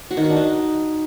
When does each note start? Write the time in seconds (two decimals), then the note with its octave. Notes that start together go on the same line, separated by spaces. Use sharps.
0.11 F#4
0.17 D#3
0.24 F#4
0.30 D4
0.37 D#4